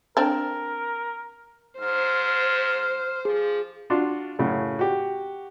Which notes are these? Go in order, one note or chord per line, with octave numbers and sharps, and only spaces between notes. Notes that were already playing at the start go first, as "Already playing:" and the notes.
C4 D4 A#4
G#2 C5 F6
F3 G#4
D4 F4 F#4 D5 C6
F#2 A2 C#3
F#4 G4